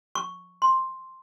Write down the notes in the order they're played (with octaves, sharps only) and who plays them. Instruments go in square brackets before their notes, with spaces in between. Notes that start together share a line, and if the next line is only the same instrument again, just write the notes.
[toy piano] C#6
C6